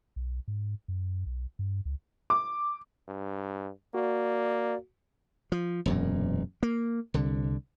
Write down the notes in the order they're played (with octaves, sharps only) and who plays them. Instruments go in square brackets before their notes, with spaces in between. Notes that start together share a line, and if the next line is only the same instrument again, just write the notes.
[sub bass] B1
G#2
F#2
B1
G2
C#2
[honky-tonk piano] D6
[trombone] G2
[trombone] A#3 [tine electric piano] F#4 [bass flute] D5
[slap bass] F3
E1 F#2 A#2
A#3
C2 D3